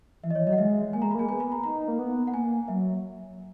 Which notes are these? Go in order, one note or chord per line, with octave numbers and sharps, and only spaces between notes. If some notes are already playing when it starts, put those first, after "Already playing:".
E3 E5
D#5
E3 C#5
F#3 D#5
F#5
G#3 E5
A#3 G#5
G#3 A#5
B5
A#3 G#5
B3 G#5
B5
A#5
D#4 A#5
A#3
B3
F#5
A#3 G#5
F#3 E5